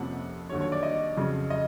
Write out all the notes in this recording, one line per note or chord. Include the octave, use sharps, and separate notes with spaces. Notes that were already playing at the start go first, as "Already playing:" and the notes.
Already playing: F2 C3 F3 A#3 C#4 F#5
D#2 D3 F#3 C#5
C#5
D5
D#5
F2 C#3 F#3
D#5